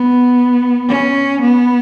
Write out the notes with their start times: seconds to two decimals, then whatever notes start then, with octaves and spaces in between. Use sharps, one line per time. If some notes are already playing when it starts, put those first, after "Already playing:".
Already playing: B3
0.89 C#4
1.41 B3